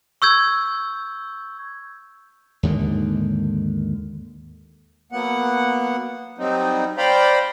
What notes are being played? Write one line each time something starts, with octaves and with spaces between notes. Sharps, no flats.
C#6 E6 G6 G#6
D#2 G#2 D3 D#3
F#3 A#3 B3 F#5
F#3 G3 C4 D#4
C5 D5 F5 G5 A#5 B5